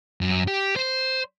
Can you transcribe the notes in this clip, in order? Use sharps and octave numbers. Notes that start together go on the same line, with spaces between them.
F#2
G4
C5